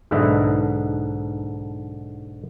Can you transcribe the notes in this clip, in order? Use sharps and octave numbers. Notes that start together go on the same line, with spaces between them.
B1 G#2 D3 B4 D#5 E5